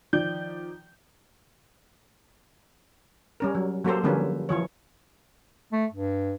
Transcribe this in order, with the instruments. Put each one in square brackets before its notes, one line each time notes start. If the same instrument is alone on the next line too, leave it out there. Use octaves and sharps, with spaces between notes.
[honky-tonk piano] D#3 F3 D5 G6
[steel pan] G3 C#4 A#4
F#3
F#3 A#3 G4 A4 C5
D3 F3 G3 A#3 C#4 B4
E3 F3 C#5
[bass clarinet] A3
G2